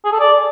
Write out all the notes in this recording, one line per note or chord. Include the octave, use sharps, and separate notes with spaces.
G#4
A4
D5